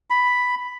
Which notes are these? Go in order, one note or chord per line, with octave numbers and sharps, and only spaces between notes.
B5